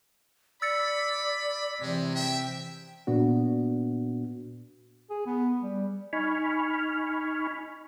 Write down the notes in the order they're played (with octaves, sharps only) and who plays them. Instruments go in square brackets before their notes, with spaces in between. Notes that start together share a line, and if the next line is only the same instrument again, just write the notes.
[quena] D5 [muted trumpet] B5 [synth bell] E6 A6 C#7
[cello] C3 E3 [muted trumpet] G#3
[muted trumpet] E5 [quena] G5
[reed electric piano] A#2 B3 D4 F#4
[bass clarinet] G#4
B3
G3
[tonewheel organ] D#4 G#5 B5 C#6 F6